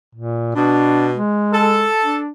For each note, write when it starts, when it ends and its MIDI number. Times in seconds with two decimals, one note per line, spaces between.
0.15 0.52 46
0.55 1.16 47
0.55 1.08 62
1.16 1.88 56
1.53 2.17 69
2.03 2.30 62